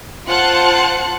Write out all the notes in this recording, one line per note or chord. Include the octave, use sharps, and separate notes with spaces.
F4 C5 F#5 A5 F#6 C#7